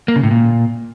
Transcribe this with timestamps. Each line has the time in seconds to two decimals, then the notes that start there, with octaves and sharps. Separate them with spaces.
0.08 A#3
0.16 C#3
0.23 A2
0.31 A#2